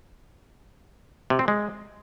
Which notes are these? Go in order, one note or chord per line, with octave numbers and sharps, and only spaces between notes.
C3
C4
G#3